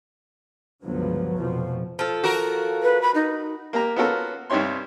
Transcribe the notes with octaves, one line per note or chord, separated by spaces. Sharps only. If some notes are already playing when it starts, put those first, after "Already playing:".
C#2 G2 D3 F3 F#3 B3
F1 F2 B2 F3
F3 A4
F#4 A#4
B4
B5
D#4
A#3 G4 A#5
B3 C#4 F4 F#4 A4 A#4
C2 G2 D#4 G4 C#5 C6